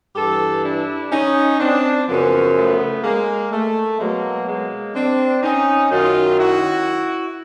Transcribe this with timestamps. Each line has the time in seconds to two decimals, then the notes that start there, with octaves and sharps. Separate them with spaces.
0.16 G2 E3 G4 A4
0.64 D4 E4
1.12 C#4 D#4
1.60 C4 D4
2.08 F#2 C#3 F3 B3 C#4
2.56 A3 B3
3.04 G#3 A#3
3.52 A3
4.00 B2 F#3 G#3 A#3
4.47 G#3 A#3
4.95 C4 D4
5.43 C#4 D#4
5.91 F#2 D#3 F#3 D#4 F4
6.39 E4 F#4